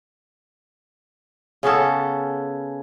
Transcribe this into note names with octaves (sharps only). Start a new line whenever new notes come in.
C#3 B3 C#4 A4